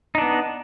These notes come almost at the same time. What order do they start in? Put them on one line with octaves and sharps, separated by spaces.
D#4 D4 B3